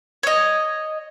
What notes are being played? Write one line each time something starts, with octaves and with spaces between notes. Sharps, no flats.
C#5 D#5